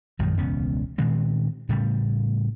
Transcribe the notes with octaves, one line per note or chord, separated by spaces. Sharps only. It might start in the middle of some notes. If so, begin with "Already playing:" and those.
A#1 F#2 D#3 G#3
E1 C#2 B3 C#4
A#2 D#3 G#3 C4
A2 C#3 G3 A3